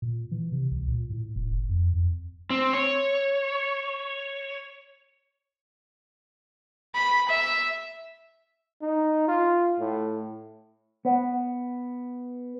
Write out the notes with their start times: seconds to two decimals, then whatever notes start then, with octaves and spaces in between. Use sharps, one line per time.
0.02 A#2
0.31 E3
0.52 C3
0.72 C2
0.88 A#2
1.10 A2
1.36 D#1
1.51 F1
1.69 F2
1.94 F2
2.50 C4
2.73 C#5
6.95 B5
7.29 E5
8.82 D#4
9.28 F4
9.80 A2
11.05 B3